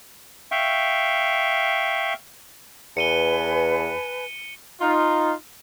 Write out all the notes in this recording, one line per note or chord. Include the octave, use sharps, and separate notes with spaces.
E5 F5 G5 C#6
E2 B4 G#5 A5 C#7 D#7 G7
D#4 F4